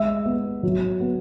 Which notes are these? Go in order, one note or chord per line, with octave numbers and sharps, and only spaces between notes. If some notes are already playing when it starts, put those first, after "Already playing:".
Already playing: G#3 E5
B3
F#3
B3